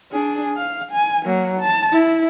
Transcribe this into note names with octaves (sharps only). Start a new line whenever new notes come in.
D4 G#4
F5
G#5
F#3 A#3
A5
E4